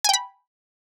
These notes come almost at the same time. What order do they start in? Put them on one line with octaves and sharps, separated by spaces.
G#5 G5 B5